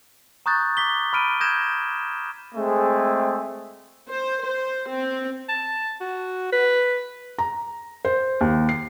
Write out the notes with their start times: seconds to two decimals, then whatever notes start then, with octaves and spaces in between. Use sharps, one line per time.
0.46 A#5 C#6 D#6 F#6 G6 A6
0.77 D6 B6 G7
1.13 B5 F6 D7 D#7
1.40 D#6 G6 G#6 A#6 E7
2.55 G#3 A3 C4 G#4
4.09 C5
4.45 C5
4.88 C4
5.49 A5
6.01 F#4
6.52 B4
7.38 A#5
8.05 C5
8.41 D#2
8.69 C7